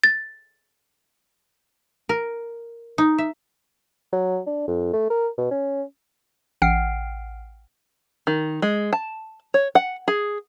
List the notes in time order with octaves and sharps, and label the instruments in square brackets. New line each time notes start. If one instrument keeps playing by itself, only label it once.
[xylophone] A6
[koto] A#4
D#4
E5
[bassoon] F#3
D4
F2
A3
A#4
B2
C#4
[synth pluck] A1 F#5 G5 F6 C7 D7
[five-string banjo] D#3
G#3
A5
C#5
F#5
G#4